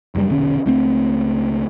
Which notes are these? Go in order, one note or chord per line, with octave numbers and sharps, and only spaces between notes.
F#1 F#2 B2 G3
E1 A#1 D3 C#4
C#2 A3 C4